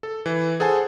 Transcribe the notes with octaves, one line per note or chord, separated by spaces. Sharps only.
A4
E3
G#4 A4 C5 F#5 G#5 A5